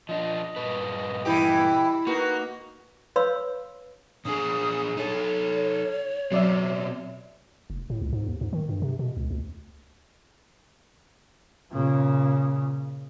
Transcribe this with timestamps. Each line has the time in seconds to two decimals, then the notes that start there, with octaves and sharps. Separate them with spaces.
0.09 F3 D4 D#5
0.56 G2 A#2 B4
1.25 E3 E4 G4
2.07 A#3 D#4 F#4 B4
3.16 B4 C#5 F5 B5 C6 E6
4.25 A#2 D4 G#4 D#6
4.97 D#4 A4 C#5
6.32 B2 F#3 C4 D5 E5
7.70 F1
7.90 A2
8.01 C#2
8.13 G#2
8.26 D#2
8.41 G#2
8.53 D#3
8.69 G2
8.82 C3
8.99 B2
9.17 C#2
9.30 D2
11.72 A#2 C#3